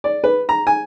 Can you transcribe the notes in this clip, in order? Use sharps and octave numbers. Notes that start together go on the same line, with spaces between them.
D5
B4
A#5
G#5